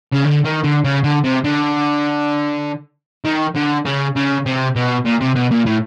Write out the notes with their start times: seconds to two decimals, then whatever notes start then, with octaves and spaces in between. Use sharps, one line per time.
0.12 C#3
0.24 D3
0.45 D#3
0.64 D3
0.85 C#3
1.04 D3
1.24 C3
1.44 D3
3.24 D#3
3.55 D3
3.85 C#3
4.16 C#3
4.46 C3
4.76 B2
5.05 A#2
5.20 C3
5.35 B2
5.51 A#2
5.66 A2